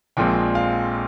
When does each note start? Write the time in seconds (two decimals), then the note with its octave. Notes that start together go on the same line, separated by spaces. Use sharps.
0.17 A#1 A#2 F3 G#3 C4 G5
0.55 F5